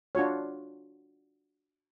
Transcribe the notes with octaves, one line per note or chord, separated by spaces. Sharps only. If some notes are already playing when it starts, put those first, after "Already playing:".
D4 F4 F#4 C#5